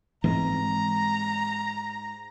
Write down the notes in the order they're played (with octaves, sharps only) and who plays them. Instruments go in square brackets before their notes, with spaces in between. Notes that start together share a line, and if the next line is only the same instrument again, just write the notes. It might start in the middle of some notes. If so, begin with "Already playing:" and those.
[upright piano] G#2 [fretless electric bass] E3 G#3 C4 [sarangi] A#5